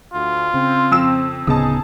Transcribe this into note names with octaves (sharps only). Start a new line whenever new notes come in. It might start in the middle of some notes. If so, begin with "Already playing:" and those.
D2 F4
C#3 C4
F2 E6 E7
D1 C#3 B3 D#4 G#4 A5 D#6